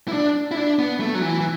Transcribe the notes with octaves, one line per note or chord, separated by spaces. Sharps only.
E4
D4
E4
D4
B3
A3
F#3
E3
E3